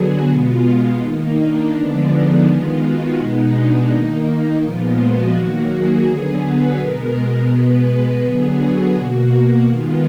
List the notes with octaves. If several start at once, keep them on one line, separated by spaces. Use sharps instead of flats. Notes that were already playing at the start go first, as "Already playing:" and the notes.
Already playing: D3 F#3 B3 F#4 G#4
B2 G#3 B3 F4
D#3 A#3 D#4
D4
D3 F3 G#3 B3 D4
D#4
D#3 G#3 B3 F4
F#4
B2 G#3 B3 D#4
D4
D#3 A#3 D#4
A#2 F3 G#3 B3 F4
F#4
D#3 F#3 A#3
G#4
D3 F#3 B3
B4
B2 G#3 B3 A#4
A#4
B2 G#3 B3 B4
D3 F#3 B3 G#4
F#4
B2 A#3
D#3 G#3 B3 F4